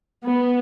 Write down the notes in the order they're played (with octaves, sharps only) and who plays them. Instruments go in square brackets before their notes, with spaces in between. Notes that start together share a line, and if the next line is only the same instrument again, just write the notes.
[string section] B3